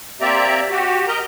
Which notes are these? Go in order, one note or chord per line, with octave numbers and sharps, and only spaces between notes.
A#3 C4 G4 D5 E5 A#5
F#4 G4
A#4 D#5 A#5